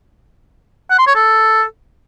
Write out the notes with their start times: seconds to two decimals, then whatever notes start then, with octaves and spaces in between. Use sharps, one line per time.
0.90 F#5
0.99 C6
1.07 C#5
1.15 A4